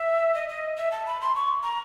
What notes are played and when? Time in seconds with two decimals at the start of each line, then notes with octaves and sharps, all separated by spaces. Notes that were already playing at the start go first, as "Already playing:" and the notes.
Already playing: E5
0.34 D#5
0.49 D#5
0.77 E5
0.92 A5
1.06 B5
1.21 C6
1.35 C#6
1.63 A#5